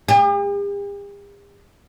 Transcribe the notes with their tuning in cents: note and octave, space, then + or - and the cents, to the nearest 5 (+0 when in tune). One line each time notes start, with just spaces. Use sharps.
G4 +45